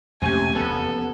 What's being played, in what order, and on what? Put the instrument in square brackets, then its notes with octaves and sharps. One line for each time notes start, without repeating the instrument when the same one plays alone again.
[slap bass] F2 A3 [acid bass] C3 [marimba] A#3 C#4 G4 [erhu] G#5
[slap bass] F1 E2 [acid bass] B3 [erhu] A4